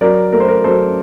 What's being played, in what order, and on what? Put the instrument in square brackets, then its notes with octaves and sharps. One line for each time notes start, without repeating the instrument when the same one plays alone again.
[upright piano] F#3 A#4 D5
A3 A#4
C5
A#4
F#3 A4 C5